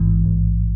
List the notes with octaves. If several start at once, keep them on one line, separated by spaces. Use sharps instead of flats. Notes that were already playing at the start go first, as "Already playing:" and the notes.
Already playing: A1 G#2 E3
A1